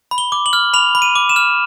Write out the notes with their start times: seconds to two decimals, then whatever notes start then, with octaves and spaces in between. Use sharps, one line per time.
0.11 B5
0.18 G7
0.32 D6
0.46 F#7
0.53 F6
0.74 B5 F7
0.95 B5
1.02 D#7
1.16 D6
1.29 E7
1.36 F6